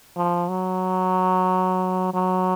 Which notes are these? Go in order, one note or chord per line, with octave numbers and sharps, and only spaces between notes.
F3
F#3
F#3